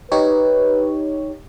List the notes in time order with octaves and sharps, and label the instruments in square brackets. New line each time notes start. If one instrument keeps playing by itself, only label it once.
[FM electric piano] D#4 G4 C#5 [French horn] B4